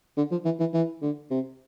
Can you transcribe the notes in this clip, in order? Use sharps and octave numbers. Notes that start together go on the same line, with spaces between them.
D3
F3
E3
E3
E3
D3
C3